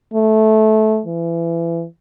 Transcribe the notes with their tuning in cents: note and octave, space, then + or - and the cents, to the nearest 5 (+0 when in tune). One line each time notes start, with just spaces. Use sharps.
A3 -15
E3 +30